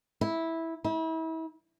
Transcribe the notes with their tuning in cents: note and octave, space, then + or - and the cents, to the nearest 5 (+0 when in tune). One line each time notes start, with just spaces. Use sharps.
E4 -10
E4 -35